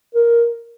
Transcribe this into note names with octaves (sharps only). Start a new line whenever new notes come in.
A#4